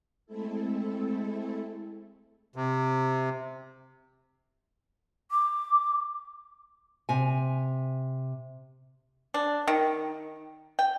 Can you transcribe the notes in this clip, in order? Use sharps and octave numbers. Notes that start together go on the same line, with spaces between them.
G#3 A3 C4 E4 A4
C3
D6
C3 G#5
D4
D#3
G5